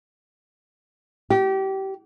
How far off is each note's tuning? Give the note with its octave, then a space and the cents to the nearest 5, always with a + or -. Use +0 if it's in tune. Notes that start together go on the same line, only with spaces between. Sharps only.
G4 -25